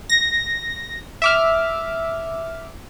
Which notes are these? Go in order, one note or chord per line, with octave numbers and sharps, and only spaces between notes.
A#6
E5 D6 F6